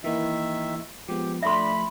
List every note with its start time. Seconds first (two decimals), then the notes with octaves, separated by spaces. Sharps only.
0.04 D#3 E3 A#3 E4 E5
1.08 F3 G#3 B3 G4
1.43 F3 A3 D4 E5 B5 C6